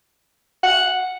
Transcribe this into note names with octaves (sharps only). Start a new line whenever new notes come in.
F#5